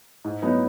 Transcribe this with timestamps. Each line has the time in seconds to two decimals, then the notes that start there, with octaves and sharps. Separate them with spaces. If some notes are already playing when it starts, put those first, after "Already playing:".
0.25 G#2
0.42 F#3 B3 D#4